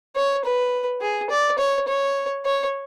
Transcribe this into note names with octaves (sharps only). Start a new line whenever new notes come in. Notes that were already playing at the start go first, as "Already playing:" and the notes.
C#5
B4
G#4
D5
C#5
C#5
C#5